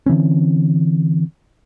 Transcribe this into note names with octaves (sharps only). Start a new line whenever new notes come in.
D3 E3 C4 C#4